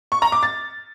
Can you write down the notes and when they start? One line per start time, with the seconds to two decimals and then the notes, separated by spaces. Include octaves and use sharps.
0.12 C#6
0.22 A#5
0.32 D6
0.43 A6